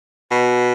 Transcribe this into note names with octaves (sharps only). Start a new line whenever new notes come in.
B2